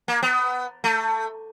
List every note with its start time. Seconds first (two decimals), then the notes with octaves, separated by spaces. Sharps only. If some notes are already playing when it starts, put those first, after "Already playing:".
0.08 A#3
0.23 B3
0.84 A3